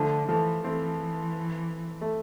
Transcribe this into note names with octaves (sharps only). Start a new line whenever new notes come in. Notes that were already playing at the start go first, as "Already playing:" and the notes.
Already playing: D3 F3 A3
E3 F3 A3
E3 A3 C4
A3